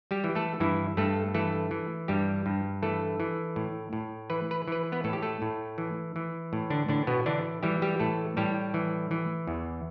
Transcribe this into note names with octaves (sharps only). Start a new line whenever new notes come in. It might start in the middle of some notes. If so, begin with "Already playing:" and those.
G3 G4
E3
A3 A4
G2 E3 E4
G2 A3 A4
E3 A3 A4
E3
G2 G3 G4
G2
E3 A3 A4
E3
A2
A2
E3 B4
B4
E3 B4
B3 B4
A2 A4
G4
A3 A4
A2
E3
E3
A2
D3 D4
A2 D3 D4
B2 B3
D3 E3 D4
E3 G3 G4
G3 G4
A2 A3 A4
A2 G3 G4
E3
E3
E2